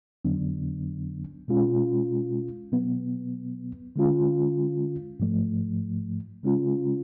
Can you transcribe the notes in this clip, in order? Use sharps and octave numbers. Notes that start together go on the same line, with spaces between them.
F2 D3 F#3 B3 D4
B2 G#3 C#4 F4
B2 F#3 B3
D3 G#3 C#4 F4
G#2 F3 A3
C#3 G#3 C#4 F4